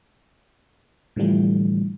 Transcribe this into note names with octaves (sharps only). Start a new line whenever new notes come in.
A2 D3 E3 F3 G3 A3